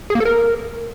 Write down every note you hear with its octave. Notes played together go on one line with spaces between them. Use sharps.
G#4
A#3
A4
A#4